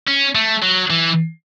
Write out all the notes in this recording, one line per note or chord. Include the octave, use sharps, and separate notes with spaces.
C#4
A3
F#3
E3